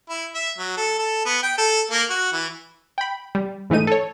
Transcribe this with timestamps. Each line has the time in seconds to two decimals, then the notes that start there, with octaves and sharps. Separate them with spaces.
0.10 E4
0.35 E5
0.58 F#3
0.77 A4
0.99 A4
1.26 B3
1.43 G5
1.58 A4
1.91 A#3
2.10 F#4
2.33 E3
2.98 G5 B5
3.35 G3
3.70 G#2 E3 A3 D#4 D#7
3.87 A4 C#5